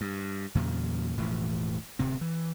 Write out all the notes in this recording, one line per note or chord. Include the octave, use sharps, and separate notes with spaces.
G2
E2 A#2 C#3 F#3
E1 A2 E3 F3
D1 C3 C4
E3